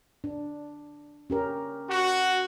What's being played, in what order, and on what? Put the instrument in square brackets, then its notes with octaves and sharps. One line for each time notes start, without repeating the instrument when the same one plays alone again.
[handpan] D4
C#4 G4 A#4
[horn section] F#4